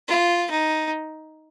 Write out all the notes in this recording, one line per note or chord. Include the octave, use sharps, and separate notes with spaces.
F4
D#4